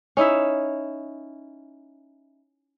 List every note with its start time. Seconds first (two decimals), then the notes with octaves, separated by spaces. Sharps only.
0.17 C#4 D#4 E4 E5